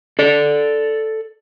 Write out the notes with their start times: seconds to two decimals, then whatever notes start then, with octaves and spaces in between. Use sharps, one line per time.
0.19 A4 D5